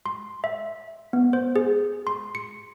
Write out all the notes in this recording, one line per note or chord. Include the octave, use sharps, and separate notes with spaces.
C6
E5
B3
C5
G#4
C6
C#7